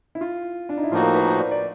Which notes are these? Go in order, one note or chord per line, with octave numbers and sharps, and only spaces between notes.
E4
F4
D4
D#4
E4
A2 F3 A#3 D#4 F4 F#4
A#4
B4
C5
D5
D5